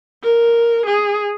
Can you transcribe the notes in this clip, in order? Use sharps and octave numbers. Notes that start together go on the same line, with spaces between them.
A#4
G#4